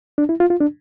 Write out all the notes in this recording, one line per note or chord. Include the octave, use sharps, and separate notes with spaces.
D4
E4
F4
F4
D4